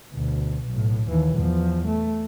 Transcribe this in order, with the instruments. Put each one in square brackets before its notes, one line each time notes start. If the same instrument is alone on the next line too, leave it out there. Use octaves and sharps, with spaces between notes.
[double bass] D2 B2
B1 A2
D#2 E3
E2 F3
A3